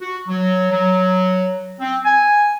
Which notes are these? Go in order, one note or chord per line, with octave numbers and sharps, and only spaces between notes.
F#4
F#3
F#3
C4
G#5